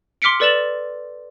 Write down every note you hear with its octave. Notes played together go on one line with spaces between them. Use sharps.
C6 D6 F6 B6 C#7 D7
A4 B4 D5 A6 E7 F#7